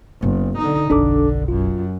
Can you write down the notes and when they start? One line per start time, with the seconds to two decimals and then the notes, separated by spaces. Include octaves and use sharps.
0.22 F#1 B3
0.58 D3 D#4
0.90 F#1 B1 D3 D4 A4 D6
1.48 F#2 F4